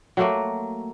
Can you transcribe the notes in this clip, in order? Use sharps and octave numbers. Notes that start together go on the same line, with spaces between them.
F#3 A3 A#3